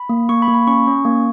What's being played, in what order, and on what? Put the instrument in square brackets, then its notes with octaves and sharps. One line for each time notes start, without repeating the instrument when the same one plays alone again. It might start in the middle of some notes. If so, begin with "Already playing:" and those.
Already playing: [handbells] B5
A#3
A#3 C#6
B5
A#3
B5
C#4 C#6
C#4
A#3